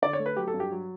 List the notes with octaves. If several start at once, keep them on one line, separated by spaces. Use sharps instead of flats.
D3 D5
C#5
A3
B4
F#3 G4
A4
G2
G4
F#3